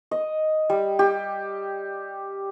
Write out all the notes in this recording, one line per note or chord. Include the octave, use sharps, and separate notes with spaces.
D#5
G3
G4